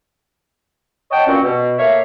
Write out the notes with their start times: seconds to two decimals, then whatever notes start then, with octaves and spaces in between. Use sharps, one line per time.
1.11 C#5 D#5 F#5 G5 A5
1.27 G2 A#2 C4 C#4 F#4
1.43 B2
1.78 A3 A#3 C#5 E5 F5